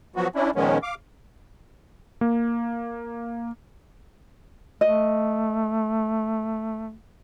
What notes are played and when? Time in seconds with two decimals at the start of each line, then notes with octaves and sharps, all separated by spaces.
0.16 F3 F#3 B3 F#4
0.35 C#4 D4 E4
0.55 A#2 D#3 F3 G#3 B3 C#4
0.83 F5 D6
2.21 A#3
4.81 A3 D#5